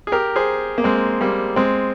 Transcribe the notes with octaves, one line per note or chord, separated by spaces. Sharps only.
G#4
G4 A#4
G#4 C5
A#3
G#3 C4
G3 A#3
G#3 C4